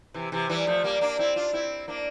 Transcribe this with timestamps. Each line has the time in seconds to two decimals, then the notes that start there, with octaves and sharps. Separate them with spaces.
0.14 C3 E3
0.32 C3 E3
0.49 E3 G3
0.67 F3 A3
0.84 G3 A#3
1.01 A#3 D4
1.19 C4 E4
1.36 D4 F4
1.53 C4 E4
1.88 A#3 D4